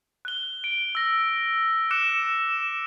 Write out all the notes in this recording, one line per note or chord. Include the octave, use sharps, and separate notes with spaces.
F#6 G7
D7
E6 A#6
D6 F#6 C#7 E7